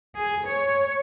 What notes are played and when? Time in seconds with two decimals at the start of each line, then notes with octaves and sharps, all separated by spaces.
0.16 G#4
0.47 C#5